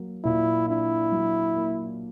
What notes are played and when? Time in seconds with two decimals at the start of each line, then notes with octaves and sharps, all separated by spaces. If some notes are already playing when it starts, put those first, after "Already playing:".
Already playing: F#3 A#3
0.24 A#2 E4
0.68 D4 E4
1.12 F#3
1.56 A#3